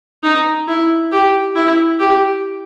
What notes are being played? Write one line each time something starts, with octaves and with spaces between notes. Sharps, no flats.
D#4
E4
G4
E4
G4